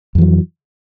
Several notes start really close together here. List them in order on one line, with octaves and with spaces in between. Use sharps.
F2 E3 F#3